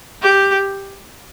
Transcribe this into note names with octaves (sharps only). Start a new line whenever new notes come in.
G4